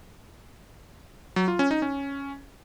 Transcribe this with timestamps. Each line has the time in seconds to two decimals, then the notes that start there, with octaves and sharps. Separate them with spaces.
1.36 F#3
1.48 F4
1.59 C#4
1.71 D#4
1.82 C#4